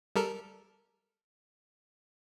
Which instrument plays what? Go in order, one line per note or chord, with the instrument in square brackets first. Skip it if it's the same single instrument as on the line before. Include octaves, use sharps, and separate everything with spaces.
[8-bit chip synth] G3 A4 A#4